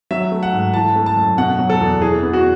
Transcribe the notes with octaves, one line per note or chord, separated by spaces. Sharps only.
F#3 E5
A3
F#5
G#2
E3 A5
A3
A5
F#2
B2 F#5
F#3
A4
E2
E3 G#4
B3
F#4